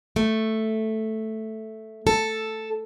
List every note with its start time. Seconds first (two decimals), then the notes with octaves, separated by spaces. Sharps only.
0.16 A3
2.07 A4